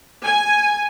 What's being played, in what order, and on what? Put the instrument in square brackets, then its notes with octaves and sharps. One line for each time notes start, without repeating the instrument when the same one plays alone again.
[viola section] G#5